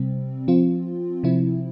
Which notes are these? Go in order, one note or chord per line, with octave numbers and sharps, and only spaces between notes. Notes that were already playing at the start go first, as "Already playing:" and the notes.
Already playing: C3 G3 C4
F3 C4 F4
C3 F3 C4 E4